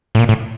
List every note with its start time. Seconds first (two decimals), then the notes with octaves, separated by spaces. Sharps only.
0.15 A2
0.19 A#2
0.29 A2